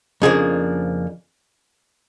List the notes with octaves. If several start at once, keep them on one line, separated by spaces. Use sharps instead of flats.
F2 C#3 F3 A#3 D4 G#4